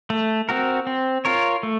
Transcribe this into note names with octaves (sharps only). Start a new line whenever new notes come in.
A3
C4 F#4 A#4
C4
F4 A#4 C#5
A3